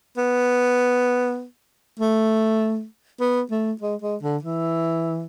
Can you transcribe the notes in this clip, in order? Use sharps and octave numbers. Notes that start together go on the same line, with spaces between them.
B3
A3
B3
A3
G#3
G#3
D3
E3